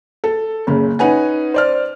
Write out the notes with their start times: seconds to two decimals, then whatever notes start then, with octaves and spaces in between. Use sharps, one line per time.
0.24 A4
0.67 F#1 C#3
0.99 C#4 D#4 B4 F#5 G#5
1.54 C5 D5 F6